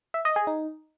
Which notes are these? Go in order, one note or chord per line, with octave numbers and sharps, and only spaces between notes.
E5
D#5
G#4
D#4